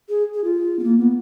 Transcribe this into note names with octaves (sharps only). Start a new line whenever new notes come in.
G#4
G#4
F4
B3
A#3
B3